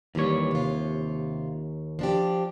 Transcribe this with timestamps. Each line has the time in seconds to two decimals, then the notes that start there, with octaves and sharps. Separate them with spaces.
0.15 D#2 E3 G3 C#5
0.51 C3 F4
1.99 F3 D4 G4